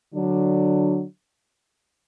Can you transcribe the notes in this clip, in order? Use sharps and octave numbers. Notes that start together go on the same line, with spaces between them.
D3 F#3 D4